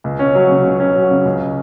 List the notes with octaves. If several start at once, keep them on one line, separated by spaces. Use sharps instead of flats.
C#2
C#4
F#3
C#3
C#2
C#4
F#3
C#3
C#2